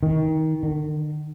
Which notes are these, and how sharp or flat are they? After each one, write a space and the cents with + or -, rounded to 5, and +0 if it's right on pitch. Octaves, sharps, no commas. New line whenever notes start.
D#3 +25
D#3 -45